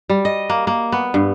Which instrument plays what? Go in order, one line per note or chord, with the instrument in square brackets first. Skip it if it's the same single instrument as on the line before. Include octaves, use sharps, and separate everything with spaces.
[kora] G3
D#5
A#3
A#3
B3
G2